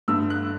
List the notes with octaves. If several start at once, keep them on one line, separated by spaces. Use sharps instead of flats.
G2 D3 A3 E6
F#6